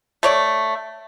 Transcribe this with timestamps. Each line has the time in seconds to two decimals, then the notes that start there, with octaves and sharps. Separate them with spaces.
0.23 A3 C#5 D5